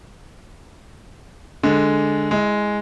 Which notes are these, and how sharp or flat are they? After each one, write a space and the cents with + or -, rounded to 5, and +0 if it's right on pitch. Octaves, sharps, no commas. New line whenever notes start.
D3 +0 G#3 +0
G#3 +0 E4 -25